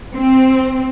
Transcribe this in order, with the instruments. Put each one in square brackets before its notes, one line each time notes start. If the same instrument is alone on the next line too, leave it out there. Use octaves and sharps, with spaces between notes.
[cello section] C4